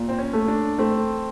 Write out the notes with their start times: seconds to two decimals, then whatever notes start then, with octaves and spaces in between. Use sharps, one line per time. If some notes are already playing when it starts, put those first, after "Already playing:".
Already playing: A#2
0.09 C4
0.18 C#4
0.33 A3
0.48 D4
0.78 A3 C4